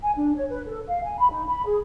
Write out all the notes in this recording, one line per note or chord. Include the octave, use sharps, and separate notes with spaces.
G#5
D4
C#5
B4
A4
F5
G#5
B5
D#4
B5
G#4